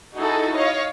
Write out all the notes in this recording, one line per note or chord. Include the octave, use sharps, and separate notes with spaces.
D#4 E4 F#4 G#4 A4 D#5
C#5 D#5 F5